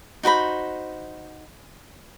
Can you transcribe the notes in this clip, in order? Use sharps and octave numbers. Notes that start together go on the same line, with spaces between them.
D#4 F#4 C5 B5